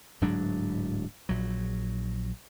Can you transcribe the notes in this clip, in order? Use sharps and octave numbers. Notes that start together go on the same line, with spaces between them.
D1 G#2 F#3 D4
A#1 F#3